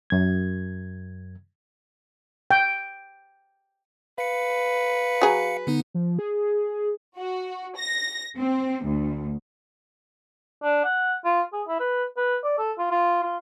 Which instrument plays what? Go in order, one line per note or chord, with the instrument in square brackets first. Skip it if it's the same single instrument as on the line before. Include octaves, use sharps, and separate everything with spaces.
[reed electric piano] F#2 G#6
[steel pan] G5
[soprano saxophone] B4 [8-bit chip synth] F5 C#7
[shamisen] F#3 G#4
[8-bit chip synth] D3 B3 D#4
[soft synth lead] F3
G#4
[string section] F#4
A#6
C4
D2
[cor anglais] D4
F#5
F4
G#4
E4
B4
B4
D5
A4
F4
F4
F4